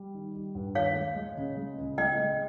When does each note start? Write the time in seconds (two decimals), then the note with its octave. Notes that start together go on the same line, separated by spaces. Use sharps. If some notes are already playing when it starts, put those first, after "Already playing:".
Already playing: G3
0.14 D#3
0.35 G3
0.55 G2
0.75 D#2 C#5 F5
0.96 G#3
1.16 G#3
1.37 C#3
1.57 G#3
1.78 C#2
1.98 G#3 D#5 G5
2.18 G#3